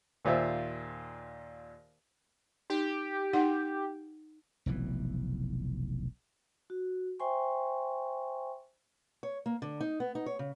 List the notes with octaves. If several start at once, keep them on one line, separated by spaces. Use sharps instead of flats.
D#2 A#2 F4 C5 E5
D#4 G4
D#4 F#5 C6
F1 B1 E3
F#4
C5 E5 G5 G#5 C6 C#6
C#5
A#3
D3
D#4
B3
D#4
C#5
C#3